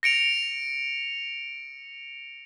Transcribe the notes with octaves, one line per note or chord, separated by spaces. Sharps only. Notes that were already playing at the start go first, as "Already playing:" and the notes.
A#6 C#7 D7 F7